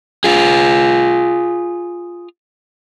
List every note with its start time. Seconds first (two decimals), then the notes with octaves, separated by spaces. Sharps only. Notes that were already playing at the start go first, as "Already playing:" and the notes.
0.24 F4 G#4